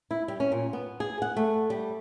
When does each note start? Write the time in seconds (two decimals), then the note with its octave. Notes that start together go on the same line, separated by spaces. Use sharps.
0.11 E4
0.28 G3
0.40 C#4
0.52 A#2
0.73 B3
1.00 G#4
1.22 F#5
1.37 A3
1.70 G3